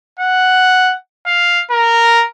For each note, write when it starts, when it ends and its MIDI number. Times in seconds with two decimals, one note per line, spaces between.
0.20 0.94 78
1.27 1.62 77
1.71 2.25 70